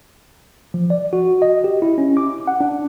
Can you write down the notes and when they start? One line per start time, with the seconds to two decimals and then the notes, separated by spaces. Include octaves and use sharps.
0.74 F3
0.90 D5
1.13 F#4
1.42 D#5
1.64 G4
1.82 E4
1.98 C#4
2.17 D6
2.47 F#5
2.61 D4